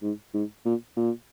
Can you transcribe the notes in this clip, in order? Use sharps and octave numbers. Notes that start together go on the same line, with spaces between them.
G#2
G#2
A#2
A#2